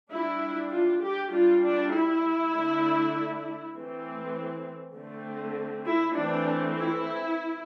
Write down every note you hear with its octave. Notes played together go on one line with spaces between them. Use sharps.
G3 D4 E4
F4
G4
G3 D4 F4
D4
E4
D3 A3 D4
E3 A3 C4
D3 A3 C4
E4
E3 A3 C4 D4
E4